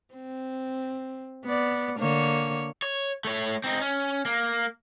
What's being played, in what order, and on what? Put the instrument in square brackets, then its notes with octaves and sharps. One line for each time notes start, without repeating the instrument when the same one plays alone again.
[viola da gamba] C4
B3 D5
D3 A#3 C#5
[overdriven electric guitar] C#5
A3 C#5
C4 D#4
C#4
A#3